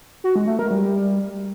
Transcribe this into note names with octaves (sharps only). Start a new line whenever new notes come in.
F#4
G#3
A3
A#4
G3